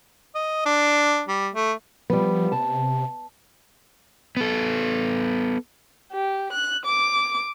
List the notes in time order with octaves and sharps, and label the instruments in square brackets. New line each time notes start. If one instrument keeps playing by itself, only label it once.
[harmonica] D#5
D4
G3
A3
[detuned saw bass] F3 [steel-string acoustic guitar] G3 B3
[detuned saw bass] C3 [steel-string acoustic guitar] A5
[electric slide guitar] B3 A4
[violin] G4
F#6
D6